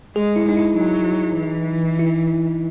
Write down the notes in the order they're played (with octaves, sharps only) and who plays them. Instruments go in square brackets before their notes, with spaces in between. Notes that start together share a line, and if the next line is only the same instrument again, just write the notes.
[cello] G#3 [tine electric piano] G#4
[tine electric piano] E4
[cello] G#3 [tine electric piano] D#4
[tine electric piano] E4
[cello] F#3 [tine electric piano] D#4
[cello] E3
[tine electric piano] E4